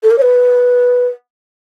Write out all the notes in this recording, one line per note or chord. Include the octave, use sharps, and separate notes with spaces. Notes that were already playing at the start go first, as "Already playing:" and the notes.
A4
A#4
C#5
B4